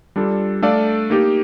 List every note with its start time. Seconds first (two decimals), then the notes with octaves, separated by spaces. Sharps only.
0.16 G3 D4 F4 A4
0.62 A3 D4 A4 D5 F5
1.10 A#3 D#4 G4